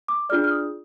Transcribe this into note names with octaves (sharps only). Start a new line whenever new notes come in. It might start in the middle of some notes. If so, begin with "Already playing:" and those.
D6
D4 F4 G#4 D5 F6
F6
D#6